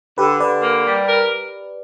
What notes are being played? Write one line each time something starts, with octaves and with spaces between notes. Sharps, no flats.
D3 G4 B4
D3 B4 D5
A#3
G3
A#4